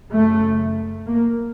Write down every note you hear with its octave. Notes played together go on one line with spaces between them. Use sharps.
F#2 C#3 A3
A#3